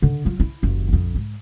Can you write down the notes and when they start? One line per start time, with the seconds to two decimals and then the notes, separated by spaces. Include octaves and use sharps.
0.02 D3
0.25 F#3 F4
0.40 E4
0.63 F#1 D#2
0.88 A#1 F2
1.15 G#2